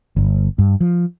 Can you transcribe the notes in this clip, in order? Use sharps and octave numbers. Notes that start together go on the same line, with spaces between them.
G1
G2
F3